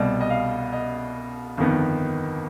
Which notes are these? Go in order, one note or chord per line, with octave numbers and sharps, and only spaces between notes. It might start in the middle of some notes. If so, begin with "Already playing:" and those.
Already playing: C2 B2 G3 D#5
D#5
F5
D#5
G1 F2 D#3 B3